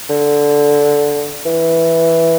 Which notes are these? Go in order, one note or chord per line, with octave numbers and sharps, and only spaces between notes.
D3
E3